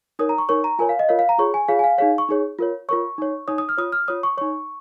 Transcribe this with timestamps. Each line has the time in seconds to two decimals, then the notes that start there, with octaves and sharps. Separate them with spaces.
0.19 D#4 A#4 C#5 D#6
0.29 A#5
0.38 C#6
0.49 D#4 A#4 C#5 C#6
0.64 A#5
0.79 F4 A#4 C#5 G#5
0.89 F5
0.99 D#5
1.09 F4 A#4 C#5 F5
1.19 F5
1.29 A#5
1.38 F4 G#4 C#5 C#6
1.54 G#5
1.68 F4 G#4 C#5 F5
1.79 G#5
1.84 F5
1.98 D#4 G#4 C#5 F5
2.18 C#6
2.29 D#4 G#4 C#5
2.59 F4 A#4 C#5
2.89 F4 A#4 C#5 C#6
3.18 D#4 C#5
3.48 D#4 C#5 D#6
3.58 D#6
3.69 F6
3.78 F4 C#5 D#6
3.92 F6
4.08 F4 C#5 D#6
4.23 C#6
4.37 D#4 C#5 C#6